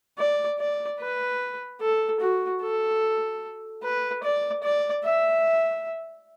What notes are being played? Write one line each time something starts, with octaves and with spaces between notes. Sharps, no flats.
D5
D5
B4
A4
F#4
A4
B4
D5
D5
E5